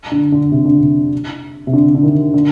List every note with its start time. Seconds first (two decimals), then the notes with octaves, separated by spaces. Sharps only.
0.12 D3
0.32 D3
0.52 C3
0.65 D3
0.78 C3
1.67 C3
1.73 D3
1.95 D3
2.03 D#3
2.34 D3